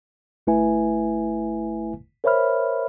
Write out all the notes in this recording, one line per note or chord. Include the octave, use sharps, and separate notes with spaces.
G1 A3 E4 B4 E5 G#5
A#4 C5 C#5 E5 B5 F6